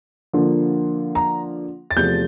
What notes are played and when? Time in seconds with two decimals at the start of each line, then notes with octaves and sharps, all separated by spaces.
0.33 D3 F3 A#3 F4
1.15 A#5
1.91 A6
1.97 E2 C3 F3 A3 G6